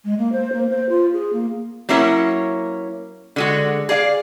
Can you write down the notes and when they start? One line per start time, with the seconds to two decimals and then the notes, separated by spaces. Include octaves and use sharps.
0.05 G#3
0.18 A#3
0.32 C5
0.53 A#3
0.70 C5
0.89 F4
1.13 G#4
1.33 A#3
1.89 F#3 A#3 C#4 E4 A#4 C#5
3.36 D3 G#3 F#4
3.89 G#4 D5 F5